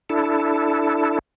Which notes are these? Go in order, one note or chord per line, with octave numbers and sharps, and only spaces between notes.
D4 E4 A4